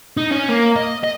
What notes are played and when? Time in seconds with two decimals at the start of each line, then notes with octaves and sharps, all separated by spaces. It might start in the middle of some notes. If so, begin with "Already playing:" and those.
0.17 D#4
0.32 C#4
0.49 A#3
0.76 D#5
1.04 D#5